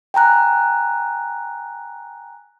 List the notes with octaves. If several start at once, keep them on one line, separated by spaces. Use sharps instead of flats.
G5 G#5 A#5 F#6